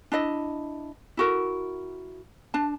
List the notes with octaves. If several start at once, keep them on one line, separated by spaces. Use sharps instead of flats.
D4 E4 D#5
E4 F#4 A#4
D4 A5